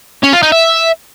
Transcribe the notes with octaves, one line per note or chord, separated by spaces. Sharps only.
C#4
F4
D#4
E5